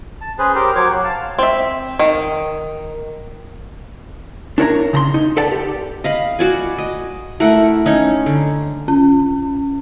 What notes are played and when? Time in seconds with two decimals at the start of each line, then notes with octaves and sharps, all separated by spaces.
0.21 A5
0.39 C#4 G#4 B4 C5
0.55 G4 A#4 C5
0.76 F#3 C5 C#5 D6
0.90 F#5
1.04 F5 A5
1.39 C4 E5
1.99 D#3
4.58 D4 E4 A#4 C#5 F#5 A#5
4.93 C#3 A#5 C6
5.14 D#4
5.37 A4 B4 D5 F#5 A5
5.52 G4
6.04 D#5 F5 B5
6.39 F#4 D5 G#5
6.78 D#5
7.40 A3 E4 A#4 F#5
7.86 C#4 D#4 C#5
8.26 D3
8.88 C#4